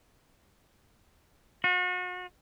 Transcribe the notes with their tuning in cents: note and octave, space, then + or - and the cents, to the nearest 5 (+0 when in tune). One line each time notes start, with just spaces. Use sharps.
F#4 -40